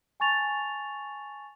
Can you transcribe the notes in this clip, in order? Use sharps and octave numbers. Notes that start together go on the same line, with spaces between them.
G#5 A5 C#6 A6 F7